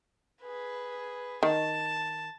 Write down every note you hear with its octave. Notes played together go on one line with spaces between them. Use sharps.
G#4 B4
D#3 A5